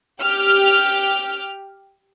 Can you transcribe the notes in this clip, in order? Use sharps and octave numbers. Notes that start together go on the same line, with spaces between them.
G4 F6